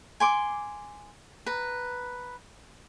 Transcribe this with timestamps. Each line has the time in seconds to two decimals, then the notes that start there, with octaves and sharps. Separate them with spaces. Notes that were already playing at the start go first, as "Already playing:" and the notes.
0.20 G#5 C6 D6
1.46 B4 A#5